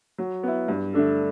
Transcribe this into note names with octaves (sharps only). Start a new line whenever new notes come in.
F#3
B3 E4
G2
D3 A3 D4 A4